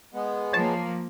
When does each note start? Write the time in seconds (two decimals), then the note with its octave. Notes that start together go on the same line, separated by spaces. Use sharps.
0.14 G#3 B3
0.53 F3 A#3 C#5 A5